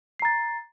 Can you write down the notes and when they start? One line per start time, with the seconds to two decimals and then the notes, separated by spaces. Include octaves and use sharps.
0.20 C7
0.22 A#5
0.25 A6